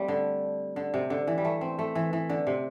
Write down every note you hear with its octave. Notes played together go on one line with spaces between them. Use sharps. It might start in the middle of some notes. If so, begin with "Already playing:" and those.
Already playing: G3 A3 C4
D3
D3
C3
D3
E3
G3
A3
C4
A3
E3
E3
D3
C3